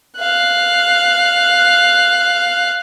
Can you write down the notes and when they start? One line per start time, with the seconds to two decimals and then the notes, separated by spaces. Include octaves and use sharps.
0.18 F5 F#6